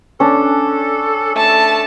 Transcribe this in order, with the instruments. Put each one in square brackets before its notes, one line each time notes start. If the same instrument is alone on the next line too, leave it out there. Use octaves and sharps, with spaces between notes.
[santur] C#4 D4 [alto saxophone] A4
[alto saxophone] A3 [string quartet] A5